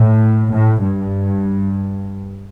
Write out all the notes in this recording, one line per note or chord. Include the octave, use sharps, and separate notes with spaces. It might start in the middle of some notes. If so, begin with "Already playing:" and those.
Already playing: A2
A2
G2